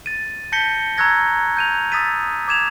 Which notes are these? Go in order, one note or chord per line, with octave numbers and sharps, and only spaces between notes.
A6 D#7
A5 G6 A#6 B6 C#7 G7
A#5 C#6 E6 F#6 G#6 A#6
G6 D#7 F7
D#6 E6 A6 B6 D#7
D6 G#6 E7 F7